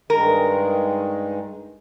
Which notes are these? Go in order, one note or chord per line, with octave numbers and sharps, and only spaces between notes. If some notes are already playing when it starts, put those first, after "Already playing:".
G2 D#3 G#3 A#4